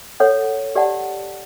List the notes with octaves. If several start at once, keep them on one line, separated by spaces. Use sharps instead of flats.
A4 C#5 F#5
G4 D5 F#5 A5